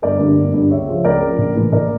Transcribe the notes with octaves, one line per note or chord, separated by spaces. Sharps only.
G1 A#4 D5
G2 D3
G1
G2 D3
C#2 C#5 E5
C#3 F3
C#2 A#4 D5
C#3 F3
A#1
A2 E3
A#1 A#4 D5